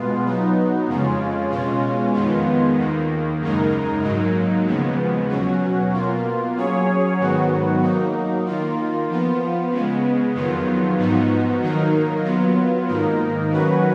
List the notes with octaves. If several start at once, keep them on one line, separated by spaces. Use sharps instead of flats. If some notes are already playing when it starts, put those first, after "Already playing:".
Already playing: B2 G#3 B3 F4
F#3 B3 D#4
F2 C#3 G#3 C#4 F4
B2 G#3 C#4 F4
F2 D#3 G#3 B3 F4
D#2 D#3 A#3
F#2 C#3 G#3 D#4 A#4
G#2 F#3 A#3 D#4
D#2 C#3 F3 G#3 B3
B2 F#3 C#4 F#4
B2 A#3 F4
F#3 C#4 G#4 C#5
G#2 D#3 F#3 B3 F#4
F#3 A#3 D#4
D#3 A#3 F4
F3 B3 F4
C#3 G#3 B3
F2 D#3 F#3 B3 F4
G#2 F3 B3 D#4 F#4
D#3 F#3 A#3 D#4 A#4
F#3 B3 F4
G#2 D#3 A#3 D#4 A#4
D#3 F#3 C#4 F#4 B4